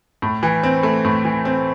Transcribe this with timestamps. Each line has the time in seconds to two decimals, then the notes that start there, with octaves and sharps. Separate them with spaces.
0.22 A2
0.43 E3
0.63 C4
0.83 A3
1.05 A2
1.25 E3
1.45 C4